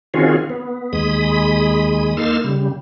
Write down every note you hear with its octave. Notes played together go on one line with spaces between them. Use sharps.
D#3 C4 C#4 F4 F#4 G#4
B3
D#2 G#3 B5 D#6
A#3 D#4 A4 C6 E6 F6
C#3 G3